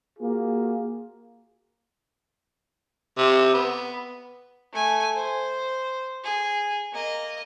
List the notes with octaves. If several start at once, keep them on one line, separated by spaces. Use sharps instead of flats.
A#3 F4 F#4 G#4
C3
B3
A3 G#5
C5
G#4
A#3 D#5